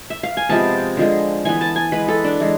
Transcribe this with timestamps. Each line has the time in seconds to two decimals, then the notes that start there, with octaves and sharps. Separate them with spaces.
0.10 E5
0.23 F5
0.37 G#5
0.49 C3 F3 G#3 B3 A5
0.97 D3 F3 G#3
1.45 E3 B3 G#5
1.61 A5
1.76 G#5
1.92 E3 G#3 B3 B4
2.08 A4
2.24 D4
2.40 E3 G#3